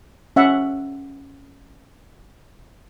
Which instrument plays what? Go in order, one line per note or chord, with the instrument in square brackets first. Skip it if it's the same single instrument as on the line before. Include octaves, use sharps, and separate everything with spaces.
[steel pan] C#4 E5 F#5